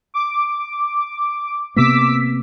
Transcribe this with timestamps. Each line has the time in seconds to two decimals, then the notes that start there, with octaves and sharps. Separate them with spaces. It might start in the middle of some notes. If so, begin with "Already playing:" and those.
0.14 D6
1.76 C3 A#3 B3 D6 E6 B6